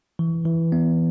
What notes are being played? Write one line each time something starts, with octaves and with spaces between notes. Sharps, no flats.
E3
E3
B3